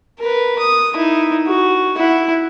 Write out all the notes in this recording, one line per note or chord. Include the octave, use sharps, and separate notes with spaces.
A#4 B4
D#6
D#4 E4
F#4
E4 F#5